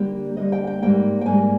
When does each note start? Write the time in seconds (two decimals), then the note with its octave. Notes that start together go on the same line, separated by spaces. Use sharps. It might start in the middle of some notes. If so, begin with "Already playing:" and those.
Already playing: D3 G3 A#3 G4
0.37 D3 G3 A#3 D#5
0.52 G5
0.67 G5
0.82 G#2 G3 A#3 G5
1.21 G5
1.26 G#2 G3 A#3 G#5